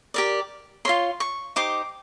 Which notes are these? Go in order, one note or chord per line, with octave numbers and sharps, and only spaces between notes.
G4 A#4 D5
F4 A#4 C#5 C6
C#6
D#4 G4 C5 D6